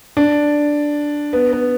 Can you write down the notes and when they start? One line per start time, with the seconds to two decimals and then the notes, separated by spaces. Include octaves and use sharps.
0.17 D4
1.33 B3
1.52 B3